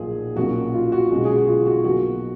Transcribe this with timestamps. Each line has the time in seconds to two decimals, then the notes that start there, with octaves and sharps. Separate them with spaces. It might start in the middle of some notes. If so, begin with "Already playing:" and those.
Already playing: B1 A#2 F3 G#4
0.36 B1 A#2 F#3 A#3 C#4 F#4
0.74 F4
0.92 F#4
1.11 B1 B2 G#3 C#4
1.25 G#4
1.36 F#4
1.48 F4
1.66 F#4
1.84 B1 B2 F#3 A#3 F#4